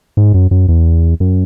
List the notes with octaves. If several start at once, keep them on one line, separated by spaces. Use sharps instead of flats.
G#2
F#2
F#2
E2
F#2